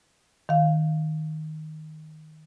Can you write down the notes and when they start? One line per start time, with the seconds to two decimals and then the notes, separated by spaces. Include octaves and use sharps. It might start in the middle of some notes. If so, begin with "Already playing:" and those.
0.49 D#3 F5